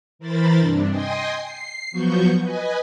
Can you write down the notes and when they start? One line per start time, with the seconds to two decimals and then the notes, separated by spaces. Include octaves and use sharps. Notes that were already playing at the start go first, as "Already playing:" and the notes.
0.19 E3 A#4 C5 B5 A6
0.59 G2 C3 D4
0.89 D#5 G5 G#5 C6 D#6
1.32 C7
1.91 F3 F#3 B3 F#4 C#6 G6
2.41 B4 D#5 G#5